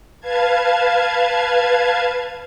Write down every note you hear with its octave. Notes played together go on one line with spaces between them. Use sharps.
B4 F5 A5 G#6